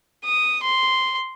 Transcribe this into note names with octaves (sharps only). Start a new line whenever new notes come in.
D#6
C6